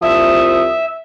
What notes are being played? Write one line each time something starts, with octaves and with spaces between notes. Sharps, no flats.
C2 F3 E5 D#6